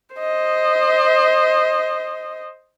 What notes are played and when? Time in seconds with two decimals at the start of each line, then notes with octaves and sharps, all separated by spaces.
0.16 C5 D#5